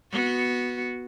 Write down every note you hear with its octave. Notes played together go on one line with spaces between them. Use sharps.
B3 F#4